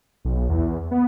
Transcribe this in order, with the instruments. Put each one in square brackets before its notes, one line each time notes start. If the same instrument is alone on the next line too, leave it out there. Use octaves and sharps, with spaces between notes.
[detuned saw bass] B1
E2
B3